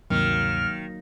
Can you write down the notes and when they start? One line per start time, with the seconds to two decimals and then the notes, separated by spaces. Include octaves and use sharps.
0.10 D2 G2 C3 D#3 F#3 A#3 F6